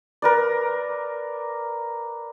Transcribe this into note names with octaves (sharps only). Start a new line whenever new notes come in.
A#4 B4 D5